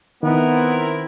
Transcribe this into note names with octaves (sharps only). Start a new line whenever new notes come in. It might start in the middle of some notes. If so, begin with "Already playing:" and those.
D#3 B3 C4 E4 A#4